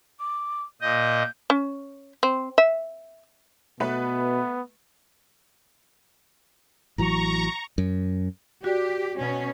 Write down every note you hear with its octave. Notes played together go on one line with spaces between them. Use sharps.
D6
A#2 D#5 G6
C#4
C4
E5
B2 A3 B3 B4
A1 E3 F#3 A#5 C#6
F#2
F#4 G4 D5
B2 C#4